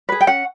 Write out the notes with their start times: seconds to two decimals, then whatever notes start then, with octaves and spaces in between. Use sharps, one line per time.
0.09 G#4 B4
0.21 G5
0.27 C#4 F#5